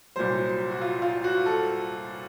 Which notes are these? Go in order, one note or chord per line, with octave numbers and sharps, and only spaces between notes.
C2 A#2 F#3 C5
F#4
F4
F4
F#4
A4